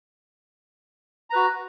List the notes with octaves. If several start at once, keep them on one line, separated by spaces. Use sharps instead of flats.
F#4 B4 A#5